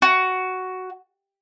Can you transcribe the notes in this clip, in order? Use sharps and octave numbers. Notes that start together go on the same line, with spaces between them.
F#4